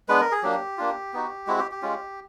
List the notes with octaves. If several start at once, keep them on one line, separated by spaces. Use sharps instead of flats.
G#3 B3 D4 B4
A#4
G#4
F#3 A#3 D4 G4
A#3 D4 F4
B3 D#4 F#4
G#3 C4 E4 F#4
G4
G4
G#3 C#4 F4